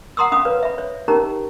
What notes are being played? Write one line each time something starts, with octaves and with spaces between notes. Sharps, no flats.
F#5 A#5 C6 D#6 E6
C#4 F5 B5 D#6
B4 C#5
E5 B5
C#5
C#4 D#4 G4 A#4 A#5